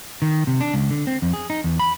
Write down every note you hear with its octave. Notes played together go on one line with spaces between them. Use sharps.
D#3
C3
D4
C#2
D3
C4
F2
G#4
D#4
E2
B5